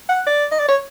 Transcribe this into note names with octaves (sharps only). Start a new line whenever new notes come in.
F#5
D5
D#5
D5
C#5